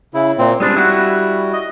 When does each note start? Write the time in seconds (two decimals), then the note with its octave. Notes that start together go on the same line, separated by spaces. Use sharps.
0.14 C#3 E4
0.38 A#2 C4
0.60 G3 G#3 C4 D4
0.76 E4 F#4
1.53 D#5